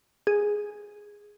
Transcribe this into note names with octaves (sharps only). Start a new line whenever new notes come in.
G#4